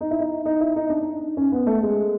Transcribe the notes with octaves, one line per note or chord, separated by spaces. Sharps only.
D#4
E4
D#4
D#4
E4
D#4
D4
D#4
C#4
B3
A3
G#3